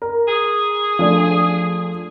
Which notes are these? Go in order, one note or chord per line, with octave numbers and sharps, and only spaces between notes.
A#4
G#4
F3 A3 D4